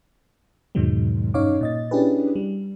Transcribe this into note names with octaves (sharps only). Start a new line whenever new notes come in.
E2 G#2 B2 D#3 F#3 G#3
G2 C#4 D#4 C#5 F5 D6
A#2 D#5 A6
C#4 D4 E4 G4 G#4 B4
G3